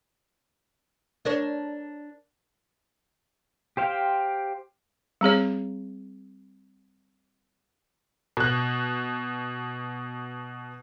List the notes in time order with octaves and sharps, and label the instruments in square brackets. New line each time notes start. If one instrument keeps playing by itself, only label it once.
[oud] D4 A#4 C#5
[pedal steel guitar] G4 C5 F5 G5
[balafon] G3 C4 G#4 C#5
[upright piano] B2 F#6